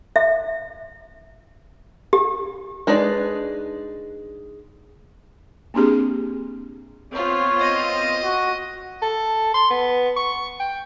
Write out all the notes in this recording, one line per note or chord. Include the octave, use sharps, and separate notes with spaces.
E5
G4
G#3 D4 D#4 B4 D5
A#3 C4 D4 G4 G#4
B3 C4 F4 C#5
D#5
F#4
A4
C6
B3
C#6
G5